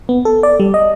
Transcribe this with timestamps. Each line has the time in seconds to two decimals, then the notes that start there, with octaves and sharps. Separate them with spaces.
0.09 B3
0.25 A4
0.43 D5
0.60 G3
0.74 D#5